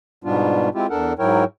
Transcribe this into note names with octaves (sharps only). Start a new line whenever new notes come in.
G#2 B2 G3 B3 D4 F4
G#3 C4 E4 F4 G4
E2 D4 A4 A#4 F#5
G#2 F#3 E4 A#4 C#5 G5